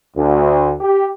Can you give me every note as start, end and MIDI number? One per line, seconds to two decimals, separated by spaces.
0.16 0.74 38
0.81 1.06 67